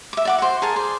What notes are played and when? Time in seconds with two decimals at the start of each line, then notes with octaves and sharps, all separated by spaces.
0.13 E5 D6
0.25 D5 F#5 D6
0.38 F#4 C5
0.62 G#4 A#4 A5
0.76 G#4 C5 D5